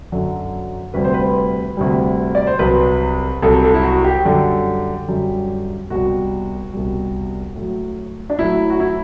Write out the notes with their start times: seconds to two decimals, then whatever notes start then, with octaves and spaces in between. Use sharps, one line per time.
0.12 F#2 D3 F#3
0.94 D2 C3 G3 B4
1.04 C5
1.14 B4
1.77 D2 C3 G3
2.35 D5
2.47 C5
2.59 C2 C3 F#3 B4
3.42 C2 C3 F#3 A4
3.63 A4
3.74 E4
3.84 F#4
4.05 G4
4.24 F#2 D3 G3 G4
5.08 F#2 D3 G3
5.90 C2 B2 G3 F#4
6.73 C2 B2 G3
7.56 A2 F#3
8.30 D4
8.39 A2 F#3 E4
8.70 F#4
8.80 E4